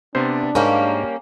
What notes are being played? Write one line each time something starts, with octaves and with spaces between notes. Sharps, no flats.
C3 B3 D4 C5 D5
G#2 G3 A#3 C#4 A#4